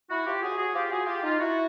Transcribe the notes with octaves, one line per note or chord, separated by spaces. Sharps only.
E4 F#4
F4 G4
F#4 G#4
F#4 G#4
F4 G4
F#4 G#4
F4 G4
D#4 F4
E4 F#4